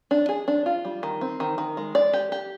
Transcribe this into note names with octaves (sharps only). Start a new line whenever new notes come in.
D4
G#4
D4
F4
G3
D#3
C4
D#3
D#3
G#3
D5
G4
G4